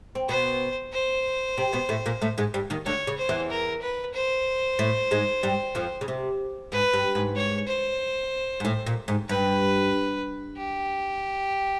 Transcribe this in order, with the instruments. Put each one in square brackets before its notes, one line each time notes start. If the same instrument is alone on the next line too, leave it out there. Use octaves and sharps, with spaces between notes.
[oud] C4
[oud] B2 B3 [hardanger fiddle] C5
[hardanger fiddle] C5
[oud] C3 C4
B2 B3
A2 A3
A#2 A#3
A2 A3
G#2 G#3
G2 G3
D#2 D#3
[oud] D2 D3 [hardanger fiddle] C#5
[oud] C#3
[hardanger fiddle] C5
[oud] E2 E3
[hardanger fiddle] A#4
B4
C5
[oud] A2 A3
G#2 G#3
G2 G3
F2 F3
C#3
C3
[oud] G#2 [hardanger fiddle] B4
[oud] G2
G#2
[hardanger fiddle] C#5
C5
[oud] G#2
A2
A#2
G#2
[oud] G2 [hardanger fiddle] B4
[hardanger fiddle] G4